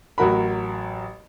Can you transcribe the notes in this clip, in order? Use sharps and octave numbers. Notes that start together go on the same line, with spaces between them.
A1 F#3 F#4 A#4 B5